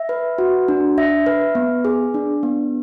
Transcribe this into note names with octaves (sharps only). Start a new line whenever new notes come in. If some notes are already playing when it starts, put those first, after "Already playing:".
Already playing: E5
B4
F#4
D4
E5
B4
B3
G#4
D4
B3